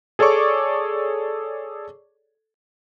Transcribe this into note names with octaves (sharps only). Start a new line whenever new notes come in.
G#4 A4 C#5 D5 C#6 D6